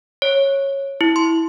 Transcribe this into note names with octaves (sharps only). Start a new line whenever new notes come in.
C#5
E4
C6